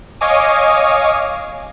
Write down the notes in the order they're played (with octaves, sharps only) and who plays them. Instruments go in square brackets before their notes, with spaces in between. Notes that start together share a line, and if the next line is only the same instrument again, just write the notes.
[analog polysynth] C#5 D#5 F5 G#5 D6 D#6